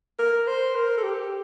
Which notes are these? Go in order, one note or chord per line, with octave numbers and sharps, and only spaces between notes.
A#4
C5
A#4
A4
G4